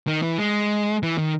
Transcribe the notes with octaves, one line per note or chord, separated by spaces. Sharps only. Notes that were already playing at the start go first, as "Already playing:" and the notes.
D#3
E3
G#3
E3
D#3